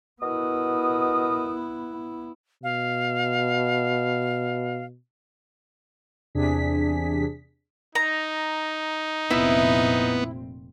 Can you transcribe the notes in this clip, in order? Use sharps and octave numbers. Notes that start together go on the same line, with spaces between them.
B2 B3 E4 A#4 D#6
B2 F5
E2 C3 D4 G#4 B6
D#4 A#5
F1 A#2 B3 C4 E4